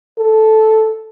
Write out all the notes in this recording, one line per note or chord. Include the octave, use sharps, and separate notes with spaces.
A4